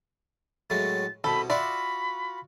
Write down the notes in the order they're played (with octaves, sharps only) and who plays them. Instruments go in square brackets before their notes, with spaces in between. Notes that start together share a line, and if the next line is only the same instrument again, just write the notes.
[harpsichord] A2 F#3 G#3 [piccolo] A6
[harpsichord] C2 B2 [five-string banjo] A4 [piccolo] B5
[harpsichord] F4 F#4 [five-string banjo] D5 E5 [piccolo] B5